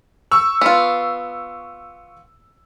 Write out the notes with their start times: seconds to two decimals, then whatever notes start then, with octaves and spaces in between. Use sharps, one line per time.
0.31 C#6 E6
0.61 B3 F4